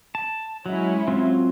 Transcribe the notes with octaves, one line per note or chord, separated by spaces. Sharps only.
A5
F#3 G#3 C#4 E4
F#3 C4 F4